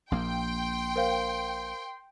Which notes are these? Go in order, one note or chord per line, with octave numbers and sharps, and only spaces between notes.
A#1 A#3 G5 C6
A#4 C5 F5